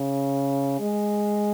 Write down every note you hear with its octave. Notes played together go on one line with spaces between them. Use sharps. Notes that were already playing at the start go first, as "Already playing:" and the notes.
Already playing: C#3
G#3